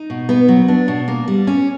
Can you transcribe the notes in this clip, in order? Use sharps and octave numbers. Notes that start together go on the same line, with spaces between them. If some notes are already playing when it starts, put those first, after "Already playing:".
Already playing: D#4
B2
B3
F#3
D4
B2
A#3
G3
C#4